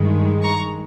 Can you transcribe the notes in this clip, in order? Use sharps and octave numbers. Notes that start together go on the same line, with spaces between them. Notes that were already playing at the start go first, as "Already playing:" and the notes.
Already playing: G2 D#3 G#3
A#5 C#6